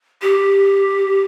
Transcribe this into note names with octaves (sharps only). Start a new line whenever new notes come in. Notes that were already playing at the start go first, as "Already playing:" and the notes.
G4